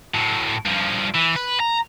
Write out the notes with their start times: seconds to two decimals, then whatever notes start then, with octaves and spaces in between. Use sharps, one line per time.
0.14 A2 F#3
0.66 G2 F3
1.15 E3
1.36 B4
1.60 A#5